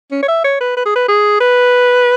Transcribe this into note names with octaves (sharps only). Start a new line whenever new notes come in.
C#4
C#5
E5
C#5
B4
B4
G#4
B4
G#4
B4